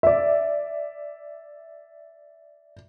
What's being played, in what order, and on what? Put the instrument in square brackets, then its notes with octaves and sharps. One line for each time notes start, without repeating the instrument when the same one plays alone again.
[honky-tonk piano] D5 E5